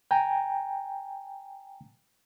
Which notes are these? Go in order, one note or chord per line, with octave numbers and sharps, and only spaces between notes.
G5 G#5 A#5